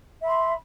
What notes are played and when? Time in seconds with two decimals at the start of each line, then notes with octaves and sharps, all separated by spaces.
0.21 E5
0.24 B5
0.27 C6